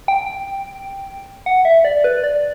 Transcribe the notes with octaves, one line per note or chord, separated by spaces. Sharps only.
G5
F#5
E5
D5
B4
D5